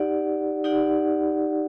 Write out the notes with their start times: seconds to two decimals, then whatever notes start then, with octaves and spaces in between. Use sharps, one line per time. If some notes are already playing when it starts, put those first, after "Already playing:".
Already playing: D#4 G4 D5 F#5
0.64 D#4 G4 D5 F#5